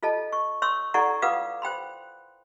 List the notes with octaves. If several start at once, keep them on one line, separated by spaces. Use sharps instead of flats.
F4 A4 D#5 A5
C#6
C#5 C6 C#6 E6
E4 A4 D5 F#5 A#5 C#6
F4 B4 F5 F#5 D6 D#6
C5 G5 B5 C6